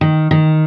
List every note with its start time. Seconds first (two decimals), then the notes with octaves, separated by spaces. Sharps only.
0.01 D#3
0.31 D#3